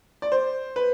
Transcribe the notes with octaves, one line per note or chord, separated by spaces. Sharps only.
D5
C5
B4